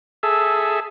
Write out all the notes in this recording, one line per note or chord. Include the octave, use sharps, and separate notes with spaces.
G#4 A4 E5